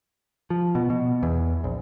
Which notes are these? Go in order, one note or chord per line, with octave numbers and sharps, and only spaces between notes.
F3
B2
B2
E2
A#1